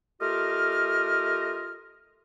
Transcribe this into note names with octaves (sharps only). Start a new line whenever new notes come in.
A3 F4 G4 A#4 D#5 F6